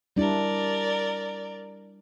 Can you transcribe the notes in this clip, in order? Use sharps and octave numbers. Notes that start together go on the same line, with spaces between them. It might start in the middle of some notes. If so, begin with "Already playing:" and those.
G3 D4 E4 A#4 D5